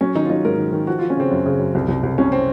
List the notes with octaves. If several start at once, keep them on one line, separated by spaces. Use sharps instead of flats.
F#3 C#4
D#3 D#4
F4
F#3 D#4
G#2 A#4
D#3
D#3
F3 F#4
F3 F4
C#4
C#3 C4
F#2
C#3
F#2
C2
C2
C2
C2 C#4
C4